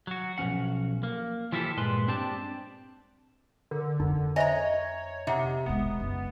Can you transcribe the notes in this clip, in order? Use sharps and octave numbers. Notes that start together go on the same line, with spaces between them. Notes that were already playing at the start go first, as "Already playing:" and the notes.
F#3 F#4
B1 G2 F3 C#4 F#5
A#3
E3 F3 E4 F4 G4 A4
G2 A#2 G#3 B4 C6
C4 D4 G4 D5 A5
D3 A#4
F2 D#4
C5 C#5 D#5 E5 G#5 A#5
C3 D#4 E5 F#5
E1 G#3 B3
F#1